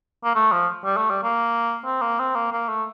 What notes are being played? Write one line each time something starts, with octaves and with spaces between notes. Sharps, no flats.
A#3
A3
F3
G3
A3
G3
A#3
C4
A#3
C4
A#3
A#3
A3